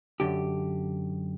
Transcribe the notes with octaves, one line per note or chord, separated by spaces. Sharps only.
F#2 D3 G4